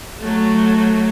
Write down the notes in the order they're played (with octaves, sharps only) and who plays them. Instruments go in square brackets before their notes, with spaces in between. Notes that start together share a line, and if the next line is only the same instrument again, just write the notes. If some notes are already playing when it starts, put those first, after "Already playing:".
[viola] F#3 A3